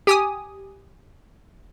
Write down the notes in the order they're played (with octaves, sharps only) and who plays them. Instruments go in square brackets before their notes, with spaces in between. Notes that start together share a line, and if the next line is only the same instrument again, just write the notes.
[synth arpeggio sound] G4 G#5 D#6